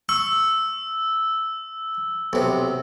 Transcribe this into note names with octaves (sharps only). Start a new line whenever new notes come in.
C#6 E6
B1 C3